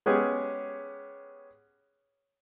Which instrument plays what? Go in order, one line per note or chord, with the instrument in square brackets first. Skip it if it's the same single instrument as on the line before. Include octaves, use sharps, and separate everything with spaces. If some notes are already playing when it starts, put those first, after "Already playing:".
[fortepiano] G#3 B3 C#4 G4 G#4